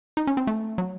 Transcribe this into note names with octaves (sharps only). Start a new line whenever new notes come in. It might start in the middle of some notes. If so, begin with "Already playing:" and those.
D#4
C#4
C4
A3
F#3